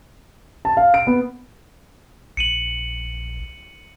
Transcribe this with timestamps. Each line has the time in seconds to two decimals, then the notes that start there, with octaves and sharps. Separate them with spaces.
0.65 A5
0.77 F5
0.94 D7
1.07 B3
2.37 A#1 C#7 D#7 F#7